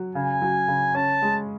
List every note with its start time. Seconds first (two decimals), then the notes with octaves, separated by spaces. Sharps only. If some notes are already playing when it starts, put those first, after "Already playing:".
Already playing: F#3
0.15 C#3 G#5
0.42 F#3
0.68 C#3
0.95 C#4 A5
1.22 G#3